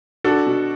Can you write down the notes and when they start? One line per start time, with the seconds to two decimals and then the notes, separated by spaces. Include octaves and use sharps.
0.24 D4 F#4 A4
0.46 B2